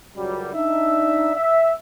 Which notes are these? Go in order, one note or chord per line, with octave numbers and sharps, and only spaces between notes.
C#2 F#2 F#3 G3
D4 D#4 E5
E5